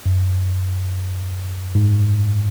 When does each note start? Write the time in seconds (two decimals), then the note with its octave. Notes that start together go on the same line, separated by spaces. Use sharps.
0.06 F#2
1.75 G#2